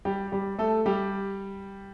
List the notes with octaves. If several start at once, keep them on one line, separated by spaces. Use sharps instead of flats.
G3 G4
G3 G4
A3 A4
G3 G4